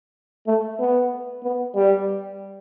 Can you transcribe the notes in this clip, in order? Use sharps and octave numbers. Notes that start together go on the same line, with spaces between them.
A3
B3
B3
G3